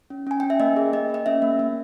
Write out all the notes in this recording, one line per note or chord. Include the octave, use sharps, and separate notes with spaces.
C#4
C#4 G#5
C#4 G5
E5
A#3 D#5
G#4
A#3 D#5
A#3 D#5
C#4 E5
A#3
A#3